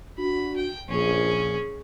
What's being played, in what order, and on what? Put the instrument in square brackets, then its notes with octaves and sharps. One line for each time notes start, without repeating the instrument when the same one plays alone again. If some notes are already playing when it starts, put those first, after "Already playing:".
[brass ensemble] D4 F#4 [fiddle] B5
[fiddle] G5
[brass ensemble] A#1 [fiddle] C#4 G#4